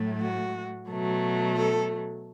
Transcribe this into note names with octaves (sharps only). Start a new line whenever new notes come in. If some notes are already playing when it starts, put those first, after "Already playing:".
Already playing: A2 F#3 A3
F#4
B2 F#3 A3
A4